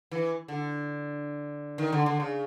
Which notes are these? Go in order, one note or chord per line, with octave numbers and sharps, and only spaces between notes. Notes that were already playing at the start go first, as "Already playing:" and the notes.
E3
D3
D#3
D3
D3
C#3